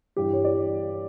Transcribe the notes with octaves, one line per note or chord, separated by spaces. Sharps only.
G2 E3 G3 G4
C#5
D5